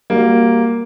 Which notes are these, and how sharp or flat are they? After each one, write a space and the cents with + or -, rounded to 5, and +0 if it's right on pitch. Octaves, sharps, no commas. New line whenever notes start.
G3 +20 A#3 +0 F#4 +0